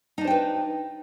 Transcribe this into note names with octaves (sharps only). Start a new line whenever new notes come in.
D4 D#4 B4 C5 G5